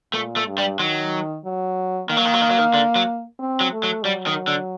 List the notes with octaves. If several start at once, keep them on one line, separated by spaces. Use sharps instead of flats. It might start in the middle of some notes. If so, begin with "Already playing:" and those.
A#2 A3
A3
G2
G3
D#3 F#3
F#3
D#3 A#3
F#3
D#3
F#3
D#3
F#3
D#3
D3
F#3
C4
F#3
A3
F#3
F#3 G3
D#3
D3